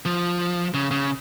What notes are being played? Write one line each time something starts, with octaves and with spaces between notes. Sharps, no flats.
F3
C#3
C#3